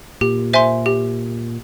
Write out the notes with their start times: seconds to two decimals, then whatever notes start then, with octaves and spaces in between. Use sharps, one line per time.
0.21 A#2 G4
0.53 C5 E5 G#5 C6
0.86 G4